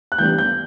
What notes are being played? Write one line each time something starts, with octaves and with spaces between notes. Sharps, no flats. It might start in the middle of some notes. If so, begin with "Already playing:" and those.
F#6
E3 G3 B3 D4 G6
G6